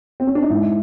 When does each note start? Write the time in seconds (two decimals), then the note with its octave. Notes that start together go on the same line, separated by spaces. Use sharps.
0.20 C4
0.27 C#4
0.35 D4
0.42 D#4
0.50 G#2 E4